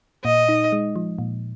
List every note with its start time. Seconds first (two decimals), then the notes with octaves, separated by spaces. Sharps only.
0.25 A#2 D#5
0.49 D#4
0.72 G#3
0.96 F3
1.19 A#2